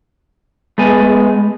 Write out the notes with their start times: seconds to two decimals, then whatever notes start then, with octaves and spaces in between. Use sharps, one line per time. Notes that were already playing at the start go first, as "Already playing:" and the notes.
0.78 G#3 A3 B3 G#5